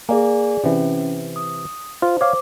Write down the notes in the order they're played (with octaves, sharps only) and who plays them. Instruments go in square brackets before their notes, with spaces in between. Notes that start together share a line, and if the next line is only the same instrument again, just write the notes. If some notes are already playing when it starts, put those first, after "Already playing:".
[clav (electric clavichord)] A#3 [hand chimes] G#4 D5 G#5
[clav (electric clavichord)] C3 E3 [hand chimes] C#4
[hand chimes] D#6
[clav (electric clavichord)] F4 [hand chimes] C5
[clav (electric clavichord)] C#5 F5 [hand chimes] D6